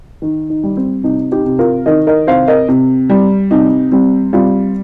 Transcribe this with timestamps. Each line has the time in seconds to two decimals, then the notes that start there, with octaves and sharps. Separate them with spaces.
0.22 D#3
0.50 D#4
0.63 G3
0.77 C4
1.04 C3 D#4
1.31 D#4 G4
1.45 C3
1.59 F4 A#4
1.86 D#3 A#4 D#5
2.07 A#4 D#5
2.27 C3 C5 F5
2.48 A#4 D#5
2.69 C3
3.10 G3
3.51 C3 D#4
3.92 G3 C4
4.33 G3 C4 F4